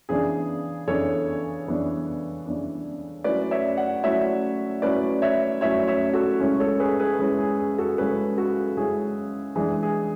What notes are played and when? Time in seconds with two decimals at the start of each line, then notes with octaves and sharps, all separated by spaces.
0.09 C#3 E3 B3 D4 G#4
0.88 C#3 E3 B3 D4 A4 C#5
1.67 C#3 E3 B3 D4
2.46 C#3 E3 B3 D4
3.24 F#3 A3 C#4 E4 B4 D5
3.51 C#5 E5
3.77 D5 F#5
4.04 F#3 A3 C#4 E4 C#5 E5
4.82 F#3 A3 C#4 E4 B4 D5
5.22 C#5 E5
5.61 F#3 A3 C#4 E4 C#5 E5
5.87 C#5 E5
6.13 F#4 A4
6.40 C#3 G#3 C#4 E4
6.60 A4 C#5
6.80 G#4 B4
7.00 G#4 B4
7.19 C#3 G#3 C#4 E4 G#4
7.38 G#4
7.59 G#4
7.78 F#4 A4
7.98 C#3 G#3 C#4 E4 G#4 B4
8.37 F#4 A4
8.77 C#3 G#3 C#4 E4 G#4
9.55 E3 G#3 D4 G#4
9.83 G#4